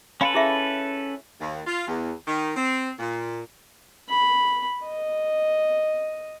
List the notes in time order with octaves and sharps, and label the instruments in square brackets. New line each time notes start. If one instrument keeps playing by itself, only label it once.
[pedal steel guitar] C#4 A4 B4 [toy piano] F5 B5 C6
[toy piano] E4 G#4 E5
[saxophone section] D#2
F4
E2
D#3
C4
A#2
[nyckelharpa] B5
D#5